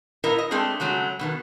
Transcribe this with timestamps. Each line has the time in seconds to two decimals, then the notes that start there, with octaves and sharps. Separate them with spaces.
0.24 A#2 E4 A#4 D#5
0.38 D#5
0.51 G#3 A3 C4 D4 G#4 A#4
0.80 C#3 F#3 G#3 A3
1.19 B2 D#3 B3